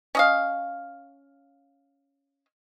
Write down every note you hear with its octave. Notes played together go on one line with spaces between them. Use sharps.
C#4 D#5 F5